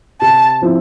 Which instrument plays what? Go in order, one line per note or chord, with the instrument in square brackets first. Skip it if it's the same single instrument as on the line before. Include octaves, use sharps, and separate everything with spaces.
[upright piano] C3 [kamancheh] A5
[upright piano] F3 C4 E4